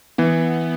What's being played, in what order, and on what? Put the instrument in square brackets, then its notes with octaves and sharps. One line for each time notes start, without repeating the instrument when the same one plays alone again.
[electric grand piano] E3 [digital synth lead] B3